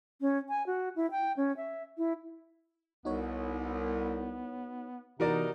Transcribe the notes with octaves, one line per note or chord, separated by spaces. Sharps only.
C#4
G#5
F#4
E4
G5
C#4
E5
E4
C2 B3 D#4 F#4 C#5
C3 E3 B3 D#4 F#4 A#4 D5